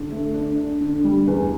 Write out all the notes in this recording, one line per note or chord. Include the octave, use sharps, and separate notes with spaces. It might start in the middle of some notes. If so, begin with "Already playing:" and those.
Already playing: D3
A3
D4
D4
D3
G3
E2